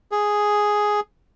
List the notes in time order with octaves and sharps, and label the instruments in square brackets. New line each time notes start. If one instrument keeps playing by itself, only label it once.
[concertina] G#4